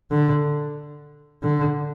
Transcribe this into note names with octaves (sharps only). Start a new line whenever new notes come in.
D3
D3